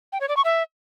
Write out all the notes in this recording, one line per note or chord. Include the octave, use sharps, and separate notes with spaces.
G5
C#5
D5
C#6
E5